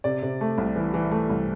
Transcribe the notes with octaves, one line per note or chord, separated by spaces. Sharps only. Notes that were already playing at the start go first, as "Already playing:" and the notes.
C3 D5
C3
A3
C2
E3
E3
A3
C2